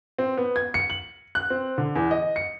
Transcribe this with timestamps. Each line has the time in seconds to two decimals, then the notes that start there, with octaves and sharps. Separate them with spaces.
0.19 C4
0.37 B3
0.56 G#6
0.74 C#7
0.90 F#7
1.35 F#6
1.50 C4
1.78 D3
1.96 E2
2.11 D#5
2.36 C#7